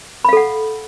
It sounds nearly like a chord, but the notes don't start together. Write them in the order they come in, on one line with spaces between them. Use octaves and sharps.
B5 F5 A4 F#5